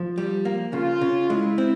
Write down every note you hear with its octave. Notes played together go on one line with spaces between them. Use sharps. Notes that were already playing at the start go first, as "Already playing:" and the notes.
Already playing: F3
G3
A#3
C#3 F4
C#3
G#3 E4
C4